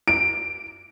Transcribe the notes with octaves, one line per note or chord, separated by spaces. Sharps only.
D7